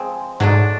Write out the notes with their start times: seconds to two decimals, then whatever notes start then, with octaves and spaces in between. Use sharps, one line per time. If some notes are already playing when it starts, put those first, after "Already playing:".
Already playing: F3 G#3 C4
0.40 G#2 F#3 A3 D4